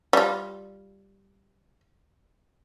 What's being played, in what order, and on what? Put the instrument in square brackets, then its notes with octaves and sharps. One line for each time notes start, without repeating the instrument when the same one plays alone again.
[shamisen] G3 F4